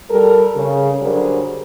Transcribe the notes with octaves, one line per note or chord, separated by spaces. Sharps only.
G3 A4 A#4
C#3
D3 F#3 G3 G#4 A#4 C5